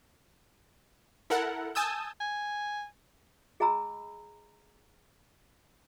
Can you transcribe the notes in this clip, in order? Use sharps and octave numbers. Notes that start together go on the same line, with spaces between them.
E4 A4 A#4 F#5
G#5 A5 D#6 E6 G6
G#5
G#4 D#5 G#5 A#5 B5 E6